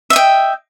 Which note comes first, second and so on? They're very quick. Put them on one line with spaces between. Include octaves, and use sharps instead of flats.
E5 D#5 G5